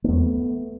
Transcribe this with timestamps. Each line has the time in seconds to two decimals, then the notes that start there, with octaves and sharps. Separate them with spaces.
0.04 A#3
0.08 E2 A3 B3